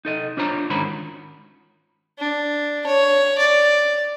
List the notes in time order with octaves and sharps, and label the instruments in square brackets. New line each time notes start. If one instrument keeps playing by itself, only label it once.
[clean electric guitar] D#4 A4 D#5
D4 F4 C5 C#5 A#5
G#2 D#3 C#4 F#4 A#4 B5
[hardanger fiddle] D4
C#5
D5